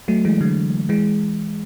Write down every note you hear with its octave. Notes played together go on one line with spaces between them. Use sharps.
F#3 A3
E3 G#3
D3 F#3
E3 G#3